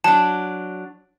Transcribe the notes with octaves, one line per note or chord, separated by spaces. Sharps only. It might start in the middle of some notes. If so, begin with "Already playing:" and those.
F#3 D4 A5